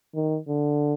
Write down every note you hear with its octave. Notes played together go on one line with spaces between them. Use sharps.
D#3
D3